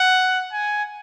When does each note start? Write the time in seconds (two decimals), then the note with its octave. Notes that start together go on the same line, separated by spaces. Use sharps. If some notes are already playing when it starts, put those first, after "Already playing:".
Already playing: F#5
0.53 G#5